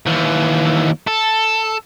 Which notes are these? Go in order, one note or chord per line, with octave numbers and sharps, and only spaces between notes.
D#2 E3
A4